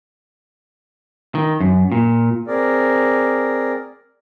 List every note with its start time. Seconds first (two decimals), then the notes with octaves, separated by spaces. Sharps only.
1.35 D#3
1.60 F#2
1.92 A#2
2.47 C4 G#4 A#4 D5